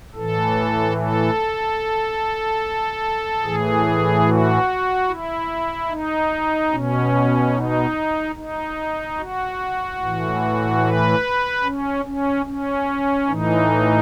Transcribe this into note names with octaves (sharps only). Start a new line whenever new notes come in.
A2 E3 A4
A4
A2 E3 G#4
F#4
E4
D#4
B2 C#4
D#4
D#4
F#4
A2 E3
B4
C#4
C#4
C#4
A2 E3 D#4